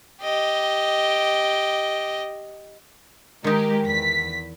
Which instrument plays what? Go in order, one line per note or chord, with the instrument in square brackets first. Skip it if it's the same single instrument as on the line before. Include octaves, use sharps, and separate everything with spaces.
[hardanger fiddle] G4 D#5
[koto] D#3 D#4 [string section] G#3 G4 A#4
[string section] E2 B6